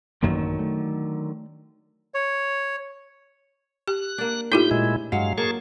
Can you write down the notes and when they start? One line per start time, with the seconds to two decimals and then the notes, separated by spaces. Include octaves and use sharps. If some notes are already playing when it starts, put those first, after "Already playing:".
0.23 A1 F#2 D3 D#3 F#3 A#3
0.59 A3
2.14 C#5
3.88 G4 F#6
4.18 A#3 D4
4.52 A2 D#4 F4 G4 E5 G6
4.71 A#2 G#3 E4
5.12 G2 F#3 G#3 F5
5.38 A#3 G#4 A5 C#6